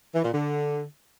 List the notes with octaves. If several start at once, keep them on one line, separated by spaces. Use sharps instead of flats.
E3
A#2
D3